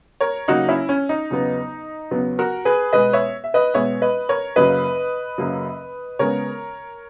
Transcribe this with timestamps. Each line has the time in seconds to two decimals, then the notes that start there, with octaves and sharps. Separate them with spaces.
0.21 A#4 C#5
0.48 C#3 F#3 A#3 D#4 F#4
0.68 C#4 E4
0.89 C#4
1.09 D#4
1.30 E2 C#3 F#3 B3
2.11 E2 C#3 F#3 B3
2.39 F#4 A#4
2.65 G#4 B4
2.93 B2 G#3 B3 B4 D#5
3.13 C#5 E5
3.44 E5
3.54 B4 D#5
3.74 B2 G#3 B3 C#5 E5
4.02 B4 D#5
4.29 A#4 C#5
4.56 F#2 C#3 F#3 A#3 B4 D#5
5.38 F#2 C#3 F#3 A#3
6.19 C#3 G#3 B3 A#4 C#5